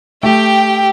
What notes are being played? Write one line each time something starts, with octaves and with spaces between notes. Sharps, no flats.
A3 G4 G5